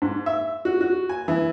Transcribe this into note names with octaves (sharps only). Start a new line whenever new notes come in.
G#2
E5
F#4
F#4
G#5
E3